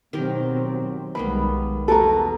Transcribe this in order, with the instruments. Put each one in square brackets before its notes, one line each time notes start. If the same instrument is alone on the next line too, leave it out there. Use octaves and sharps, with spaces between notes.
[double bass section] B2 F#3 C4 [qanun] D#3 G4 A#4
[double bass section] B1 G3 G#3 [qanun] D#3 A#3 B3 [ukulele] B5
[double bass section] E2 [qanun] B2 F#4 A#4 [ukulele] A4 A#5